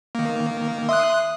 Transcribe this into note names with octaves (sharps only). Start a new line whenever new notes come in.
D#3 A#3
E5 C6 D#6 F#6